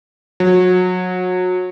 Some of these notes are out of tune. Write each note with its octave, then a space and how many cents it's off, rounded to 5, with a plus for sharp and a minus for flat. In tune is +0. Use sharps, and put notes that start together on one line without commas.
F#3 -25